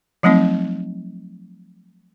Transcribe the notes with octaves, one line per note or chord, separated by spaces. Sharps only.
F3 F#3 A3 C4 D#4